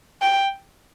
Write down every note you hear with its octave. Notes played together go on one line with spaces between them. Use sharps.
G5